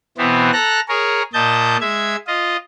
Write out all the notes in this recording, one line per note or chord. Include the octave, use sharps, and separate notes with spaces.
B2 E3 B3 C4
A4 A#5 F#6 A#6
G#4 A#4 C#5
A#2 D#5 A5 G6
G#3 E5 G#6
F4 D#5